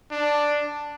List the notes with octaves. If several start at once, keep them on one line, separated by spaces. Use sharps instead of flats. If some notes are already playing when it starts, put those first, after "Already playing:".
D4